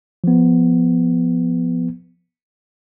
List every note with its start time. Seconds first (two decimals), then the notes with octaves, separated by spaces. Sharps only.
0.24 F3 B3